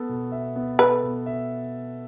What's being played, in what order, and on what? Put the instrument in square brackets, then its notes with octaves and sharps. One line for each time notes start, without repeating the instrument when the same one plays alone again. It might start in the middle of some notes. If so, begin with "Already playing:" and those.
Already playing: [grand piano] B3 A4
B2
E5
B3
[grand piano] A4 [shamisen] B4
[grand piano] B2
E5